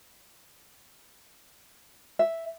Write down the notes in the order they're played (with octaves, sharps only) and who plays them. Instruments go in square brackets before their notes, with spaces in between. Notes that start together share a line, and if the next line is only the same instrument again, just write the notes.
[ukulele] E5